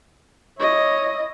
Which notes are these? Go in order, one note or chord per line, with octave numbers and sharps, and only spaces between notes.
E4 C#5 D#5